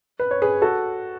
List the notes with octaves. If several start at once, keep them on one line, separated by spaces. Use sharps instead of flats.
B4
C#5
G#4 B4
F#4 A4